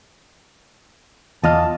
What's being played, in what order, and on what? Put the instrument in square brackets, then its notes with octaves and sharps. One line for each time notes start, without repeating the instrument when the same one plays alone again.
[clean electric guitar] E2 F4 F5 [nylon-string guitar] D#5 [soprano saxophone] A5